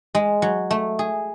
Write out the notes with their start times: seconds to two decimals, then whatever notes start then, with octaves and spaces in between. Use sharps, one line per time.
0.15 G#3
0.42 F#3
0.71 A3
0.99 G#4